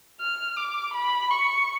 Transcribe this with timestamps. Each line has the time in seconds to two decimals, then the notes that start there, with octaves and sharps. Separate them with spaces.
0.20 F6
0.56 D6
0.94 B5
1.31 C#6